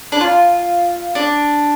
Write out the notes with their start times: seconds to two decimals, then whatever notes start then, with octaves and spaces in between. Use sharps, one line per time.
0.12 D4
0.21 F4
1.15 D4